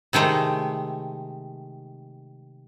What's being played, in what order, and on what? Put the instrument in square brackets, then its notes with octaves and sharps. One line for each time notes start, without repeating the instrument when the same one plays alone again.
[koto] C3 D#3 G#3 A3